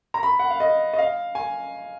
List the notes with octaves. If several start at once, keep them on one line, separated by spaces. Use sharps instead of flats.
A#5
B5
F#5
F5
D#5
D#5
F5
G#5